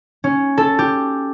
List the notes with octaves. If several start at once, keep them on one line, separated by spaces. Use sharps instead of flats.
C#4
A4
G4